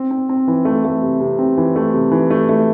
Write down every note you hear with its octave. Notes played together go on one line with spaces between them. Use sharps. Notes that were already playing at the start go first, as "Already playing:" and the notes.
Already playing: C4
C4
C4
E3
A3
A3
C3
C3
C4
E3
A3
C3
E3
A3
A3